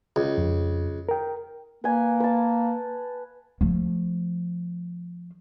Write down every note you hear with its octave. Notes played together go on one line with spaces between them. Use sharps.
C#2
F2
A#4 G5
A#3 B4 G#5
B4 A5
F3 A3